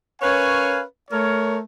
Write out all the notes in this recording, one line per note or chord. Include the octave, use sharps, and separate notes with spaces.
C#4 A#4 B4 C#5 F5 G#5
A3 A#4 C#5